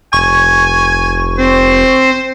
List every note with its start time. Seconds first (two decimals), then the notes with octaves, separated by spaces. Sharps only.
0.13 F1 G#5 C#6
1.38 C4 C5